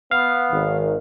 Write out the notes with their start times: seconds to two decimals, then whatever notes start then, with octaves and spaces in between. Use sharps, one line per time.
0.11 B3 F5
0.52 G#1 D#3